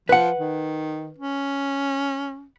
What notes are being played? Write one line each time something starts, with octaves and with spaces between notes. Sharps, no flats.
F3 B4 F#5
D#3
C#4